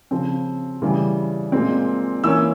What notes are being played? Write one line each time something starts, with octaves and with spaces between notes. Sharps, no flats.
C#3 F3 C4
C#3 E3 G3
A#2 G#3 C4
E3 A#3 C#4 E6